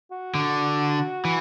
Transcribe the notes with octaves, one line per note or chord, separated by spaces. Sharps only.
F#4
D3
E3